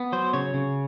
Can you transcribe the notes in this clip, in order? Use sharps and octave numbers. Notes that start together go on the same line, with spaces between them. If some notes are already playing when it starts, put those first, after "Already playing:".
Already playing: B3
F#3 C5
C#3 C#5
C#3